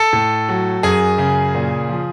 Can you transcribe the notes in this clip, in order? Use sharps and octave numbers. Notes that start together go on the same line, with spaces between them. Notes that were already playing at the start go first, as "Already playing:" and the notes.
Already playing: A4 A5
A2
F#3
F#2 G#4 G#5
C#3
A#2
F3